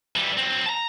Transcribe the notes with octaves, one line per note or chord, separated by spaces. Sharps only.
E3 G3
F#3 C4
A5 A#5